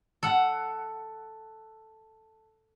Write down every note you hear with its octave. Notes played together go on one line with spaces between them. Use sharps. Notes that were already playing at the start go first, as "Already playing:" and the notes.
A4 F#5